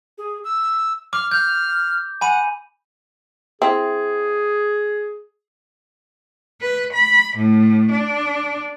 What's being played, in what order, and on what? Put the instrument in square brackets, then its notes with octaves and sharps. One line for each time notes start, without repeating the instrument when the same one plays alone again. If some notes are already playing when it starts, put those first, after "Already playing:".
[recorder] G#4
E6
[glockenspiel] D6 [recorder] F6
[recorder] F6 [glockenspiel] G6
[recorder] F#5 [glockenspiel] G#5 B5 D#7
[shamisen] C4 E4 [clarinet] G#4
[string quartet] B4
B5
A2
D4